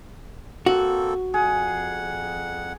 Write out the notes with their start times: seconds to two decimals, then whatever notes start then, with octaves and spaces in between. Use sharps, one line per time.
0.66 A#3 C4 F#4 A4
1.34 F2 G#4 F#5